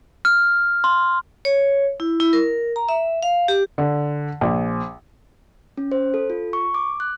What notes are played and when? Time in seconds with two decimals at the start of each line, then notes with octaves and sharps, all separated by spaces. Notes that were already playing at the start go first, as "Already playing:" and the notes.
0.25 F6
0.84 C6
1.45 C#5
2.00 E4
2.20 E4
2.33 A#4
2.76 A#5
2.89 E5
3.23 F5
3.48 G4
3.78 D3
4.41 A#1
5.77 C#4
5.92 C5
6.14 A4
6.30 F4
6.53 C#6
6.74 D6
7.00 F#6